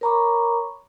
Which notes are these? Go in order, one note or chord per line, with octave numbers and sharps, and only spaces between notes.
A#4 C#5 A#5 B5 C#6 D6